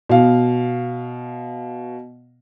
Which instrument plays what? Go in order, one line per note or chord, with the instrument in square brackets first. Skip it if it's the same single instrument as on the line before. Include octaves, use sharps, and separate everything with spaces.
[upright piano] B2 F5